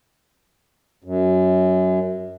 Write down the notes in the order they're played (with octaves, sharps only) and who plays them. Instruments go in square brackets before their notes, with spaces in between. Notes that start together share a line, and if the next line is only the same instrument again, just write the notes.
[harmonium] F#2